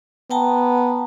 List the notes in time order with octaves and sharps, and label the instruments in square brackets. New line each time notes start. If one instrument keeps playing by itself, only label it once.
[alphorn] B3 [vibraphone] G5 A5 A#5